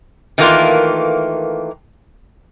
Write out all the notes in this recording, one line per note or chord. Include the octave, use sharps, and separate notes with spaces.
D#3 E3 A3 A#3 F4